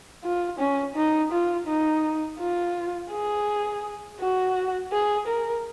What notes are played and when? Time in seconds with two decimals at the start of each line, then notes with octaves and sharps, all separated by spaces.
0.24 F4
0.59 C#4
0.95 D#4
1.32 F4
1.67 D#4
2.40 F4
3.11 G#4
4.20 F#4
4.92 G#4
5.27 A#4